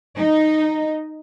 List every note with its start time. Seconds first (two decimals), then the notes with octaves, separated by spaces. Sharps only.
0.17 D#4